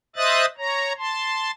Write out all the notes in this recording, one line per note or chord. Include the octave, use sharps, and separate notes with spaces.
C5 D#5 E5 D#6 F#6 A6
C#5 A#5
A5 C6